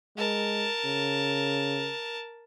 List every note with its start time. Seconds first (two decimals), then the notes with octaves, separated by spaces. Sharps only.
0.17 G#3 A#4 A5
0.85 C#3